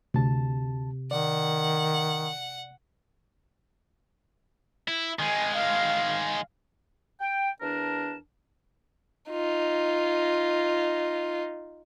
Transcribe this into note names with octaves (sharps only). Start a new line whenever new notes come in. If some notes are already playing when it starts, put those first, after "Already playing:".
D2 C3 A5
D#3 D5 F#5
E4
D#3 G#3 G#5
F5
G5
E2 D4 A#4 A5
D#4 F4